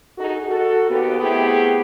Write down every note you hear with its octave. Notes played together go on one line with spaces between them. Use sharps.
D#4 F#4 G#4 A4
F#4 A4
D#2 B3 G4
A3 B3 C4 E4 G4 G#4